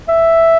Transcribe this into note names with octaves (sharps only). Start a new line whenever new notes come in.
E5